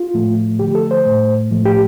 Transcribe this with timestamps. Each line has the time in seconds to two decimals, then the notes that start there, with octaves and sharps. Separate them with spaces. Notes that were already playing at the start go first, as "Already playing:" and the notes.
Already playing: F4
0.14 A2 F3 A3
0.59 D3 F3 A3 G4
0.75 A4
0.91 C5
1.05 A2 A3
1.51 A2 F3 A3
1.65 G4